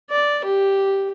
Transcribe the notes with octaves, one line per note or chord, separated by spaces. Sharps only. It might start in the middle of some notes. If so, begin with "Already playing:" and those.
D5
G4